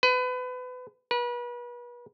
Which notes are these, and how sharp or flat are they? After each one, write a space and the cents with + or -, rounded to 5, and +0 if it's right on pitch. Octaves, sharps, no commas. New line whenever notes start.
B4 +30
B4 -35